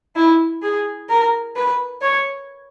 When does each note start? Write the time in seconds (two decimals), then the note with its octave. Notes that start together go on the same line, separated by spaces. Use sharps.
0.16 E4
0.62 G#4
1.09 A#4
1.56 B4
2.01 C#5